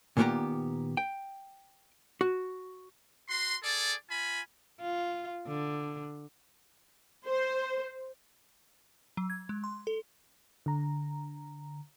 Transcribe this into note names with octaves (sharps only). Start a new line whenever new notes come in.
A#2 D#3 A#3 B3 G4 A#5
G5
F#4
F#4 C6
G#4 A4 D5
F4 G#5 B5
F4
D3
C5
F#3
G#6
G#3
C6
A4
D3 A#5